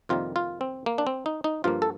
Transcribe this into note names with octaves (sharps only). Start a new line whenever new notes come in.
F2 C3 D#3 G3 A#3 F4
F4
C4
A#3
D4
C4
D#4
D#4
G2 F3 A#3 F4
A4